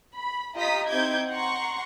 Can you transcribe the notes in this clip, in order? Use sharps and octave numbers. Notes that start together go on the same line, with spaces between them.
B5
F4 G4 D#5 A#5 D#6 B6
C4 D#4 E4 D6 G6 G#6
F#5 A#5 C6 C#6